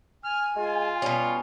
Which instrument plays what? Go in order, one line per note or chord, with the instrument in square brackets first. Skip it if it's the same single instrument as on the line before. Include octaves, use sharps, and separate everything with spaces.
[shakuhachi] G#5 [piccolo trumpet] F6
[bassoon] G#3 [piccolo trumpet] F4
[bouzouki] B2 C#4 [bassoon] G3